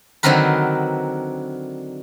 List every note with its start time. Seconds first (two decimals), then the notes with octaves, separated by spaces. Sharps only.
0.23 D3 D#3 F#3 C4 A#4 B4